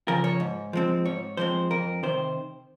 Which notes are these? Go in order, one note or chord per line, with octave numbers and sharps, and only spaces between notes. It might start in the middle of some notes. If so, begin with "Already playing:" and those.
C#3 F3 A#4
C#5
G#2
F3 G#3 C4
G#2 C#5
F3 G#3 C4 C5
F2 A#4
C3 D#3 C5